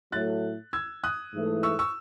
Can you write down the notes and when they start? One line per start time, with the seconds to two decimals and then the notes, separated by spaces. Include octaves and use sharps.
0.12 A2 F#3 A3 F#6 A6
0.73 E6 G#6
1.04 D#6 F#6
1.34 G#2 E3 A3 E4
1.63 C#6 E6
1.79 C#6 E6